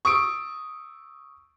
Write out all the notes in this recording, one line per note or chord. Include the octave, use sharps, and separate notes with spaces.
C#6 D#6 E6 D7